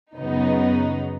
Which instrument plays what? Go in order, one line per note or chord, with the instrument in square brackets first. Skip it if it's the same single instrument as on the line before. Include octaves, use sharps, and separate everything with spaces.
[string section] F#2 C#3 F#3 B3 D#4